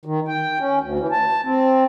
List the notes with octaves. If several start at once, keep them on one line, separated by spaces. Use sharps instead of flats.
D#3
G5
C#4
D2
E3
A5
C4